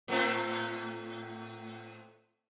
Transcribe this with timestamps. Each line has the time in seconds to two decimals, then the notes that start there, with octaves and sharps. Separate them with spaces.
0.08 A2 A3 C4